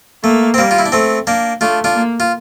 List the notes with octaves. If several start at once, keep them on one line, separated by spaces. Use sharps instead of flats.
A3 A#3
C4
G3 A#3
F4
E4
D4
A3 C4
A#3 D4
A3 D4 F4
D4 F4
A#3
F4